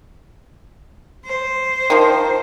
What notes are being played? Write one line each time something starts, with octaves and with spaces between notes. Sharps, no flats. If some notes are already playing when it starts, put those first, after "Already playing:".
C5
D#3 F3